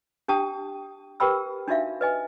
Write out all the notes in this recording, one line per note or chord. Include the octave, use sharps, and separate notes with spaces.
D4 G4 G5 A5 D#6
G4 A#4 B4 G5 B5 E6
D4 D#4 F#4 E5 F5
B4 D#5 G#5